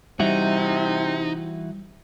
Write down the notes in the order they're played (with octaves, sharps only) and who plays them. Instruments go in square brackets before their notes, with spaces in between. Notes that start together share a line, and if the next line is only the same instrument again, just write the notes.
[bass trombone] C3 [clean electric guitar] E3 E4 F#4 [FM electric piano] G3 [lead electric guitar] D#4